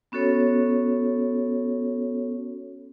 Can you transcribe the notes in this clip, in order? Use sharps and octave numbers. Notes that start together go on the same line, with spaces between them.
B3 C#4 F#4 A4 C#5